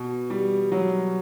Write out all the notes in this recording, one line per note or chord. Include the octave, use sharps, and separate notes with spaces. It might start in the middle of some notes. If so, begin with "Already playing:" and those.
Already playing: B2
G3
F#3